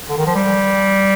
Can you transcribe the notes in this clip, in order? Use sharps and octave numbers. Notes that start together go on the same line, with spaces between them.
D3
D#3
F3
G3